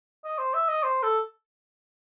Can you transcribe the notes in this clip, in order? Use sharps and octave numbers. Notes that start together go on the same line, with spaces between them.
D#5
C5
E5
D#5
C5
A4